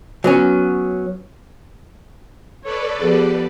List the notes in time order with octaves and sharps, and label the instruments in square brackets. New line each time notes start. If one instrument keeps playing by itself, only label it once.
[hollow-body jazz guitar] F#3 B3 C#4
[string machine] A4 B4 D5 [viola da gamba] C#5
[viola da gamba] F3 B3 G4 [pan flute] G#4